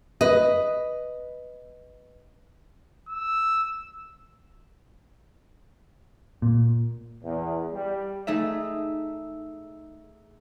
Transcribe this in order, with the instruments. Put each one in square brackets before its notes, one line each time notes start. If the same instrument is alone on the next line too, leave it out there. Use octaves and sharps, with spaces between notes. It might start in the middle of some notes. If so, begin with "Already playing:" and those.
[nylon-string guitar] B4 D#5
[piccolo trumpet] E6
[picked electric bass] A#2
[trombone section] E2
G3
[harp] A3 D#4 G#4 E5